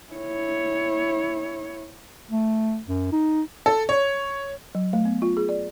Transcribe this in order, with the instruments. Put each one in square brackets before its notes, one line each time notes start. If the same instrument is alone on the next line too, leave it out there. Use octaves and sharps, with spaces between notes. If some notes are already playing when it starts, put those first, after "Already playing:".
[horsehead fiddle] E4 C#5
[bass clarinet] A3
F#2
D#4
[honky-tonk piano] A4
C#5
[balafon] F#3
A3
B3
F4
G#4
D5